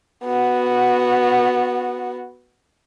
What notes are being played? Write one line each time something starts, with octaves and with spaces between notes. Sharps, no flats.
B3 F#4